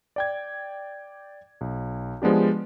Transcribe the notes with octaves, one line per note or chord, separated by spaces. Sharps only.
D5 G5 G#6
B1
F3 G#3 B3 D4 G4